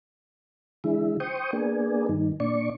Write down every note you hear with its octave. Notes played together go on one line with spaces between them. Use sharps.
D3 E3 G#3 E4
C5 G5 C#6 D#6
A#3 B3 D4 G#4
G2 D#3
A#2 D4 D5 C#6